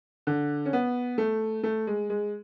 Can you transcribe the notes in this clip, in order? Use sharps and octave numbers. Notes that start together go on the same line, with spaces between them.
D3
C#4
B3
A3
A3
G#3
G#3